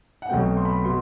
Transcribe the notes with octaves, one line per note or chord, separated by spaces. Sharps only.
F#5
B1 B2 A3 C4 G5
C6
B5
B2 C6